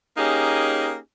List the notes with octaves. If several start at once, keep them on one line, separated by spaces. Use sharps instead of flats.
A#3 C#4 D#4 G4 G#4